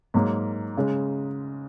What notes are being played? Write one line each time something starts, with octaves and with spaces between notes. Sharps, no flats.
G#2 F#3 A#3
C#3 G#3